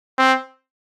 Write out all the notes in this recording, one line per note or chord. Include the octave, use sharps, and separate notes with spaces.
C4